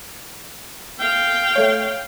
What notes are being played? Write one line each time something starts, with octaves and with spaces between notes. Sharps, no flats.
F5 G5
A3 C#5